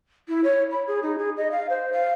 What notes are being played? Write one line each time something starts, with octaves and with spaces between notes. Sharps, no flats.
E4
C#5
B5
G#4
D#4
G#4
D#5
F5
C5
F5